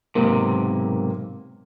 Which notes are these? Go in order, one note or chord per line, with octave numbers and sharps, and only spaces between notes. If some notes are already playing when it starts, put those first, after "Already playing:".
B1 G#2 C3 A#3